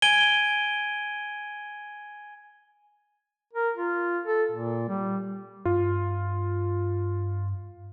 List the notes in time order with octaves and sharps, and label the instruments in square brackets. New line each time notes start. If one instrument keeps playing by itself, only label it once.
[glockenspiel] G#5 G#6 D7 D#7 G7
[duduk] A#4
F4
A4
A#2
G3
[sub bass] G2 [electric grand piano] F4